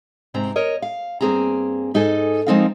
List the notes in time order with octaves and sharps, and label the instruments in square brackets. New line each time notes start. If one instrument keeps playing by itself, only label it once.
[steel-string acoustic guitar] G#2 C3 C4 A#5
A#4 C#5 D#5
F5
G2 A#3 C4 G#4 G#5 A#5
G#2 D#4 G#4 A4 G#5
F3 G#3 C4 D#4 A#4 F5